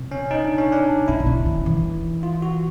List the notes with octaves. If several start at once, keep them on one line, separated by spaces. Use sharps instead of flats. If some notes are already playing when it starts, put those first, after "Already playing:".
Already playing: C3
C#4
D#4
D4
C#4
D4
C#3 E4
C3
C#3
D#3
E3
F4
F#4